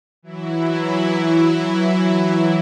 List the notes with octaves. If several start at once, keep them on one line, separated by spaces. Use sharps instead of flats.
E3 F#3 E4